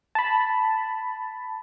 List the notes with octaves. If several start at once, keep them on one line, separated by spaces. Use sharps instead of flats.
A5 B5